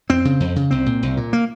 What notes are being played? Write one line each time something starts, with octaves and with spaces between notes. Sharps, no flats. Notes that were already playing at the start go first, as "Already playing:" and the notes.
F2 C4
C#3
F2
C#3
C2 C4
A#2
C2
A#2
A#3